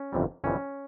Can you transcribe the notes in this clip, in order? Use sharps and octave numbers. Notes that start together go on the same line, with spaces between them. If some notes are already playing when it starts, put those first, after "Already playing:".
Already playing: C#4
G1 F2 C3 E3 G3
G1 F2 C3 E3 G3 C#4